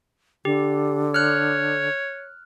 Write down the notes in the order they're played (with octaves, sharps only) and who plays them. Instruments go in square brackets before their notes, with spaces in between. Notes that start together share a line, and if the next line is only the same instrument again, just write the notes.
[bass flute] D3 [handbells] G4
[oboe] C#5 [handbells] F6 F#6